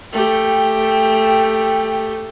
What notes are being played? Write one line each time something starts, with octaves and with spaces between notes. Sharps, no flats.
A3 G4 G5